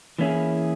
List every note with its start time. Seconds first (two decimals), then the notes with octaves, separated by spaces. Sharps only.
0.19 E3 A#3 C#4 E4 G#4